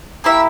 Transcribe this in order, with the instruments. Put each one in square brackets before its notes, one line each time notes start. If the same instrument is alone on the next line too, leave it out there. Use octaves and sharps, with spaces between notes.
[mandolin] A#3 E4 G4 E5